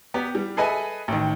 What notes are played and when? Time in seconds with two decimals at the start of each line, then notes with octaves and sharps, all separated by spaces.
0.14 B3 G4
0.35 G3
0.57 G#4 A4 B4 D#5 E5 G#5
1.08 A1 D#3